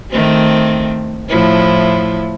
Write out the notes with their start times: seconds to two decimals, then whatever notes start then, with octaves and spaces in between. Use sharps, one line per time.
0.10 D#3 A3 C4
1.29 A2 F3 E4